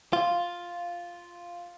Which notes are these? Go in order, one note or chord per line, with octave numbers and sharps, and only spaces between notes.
F4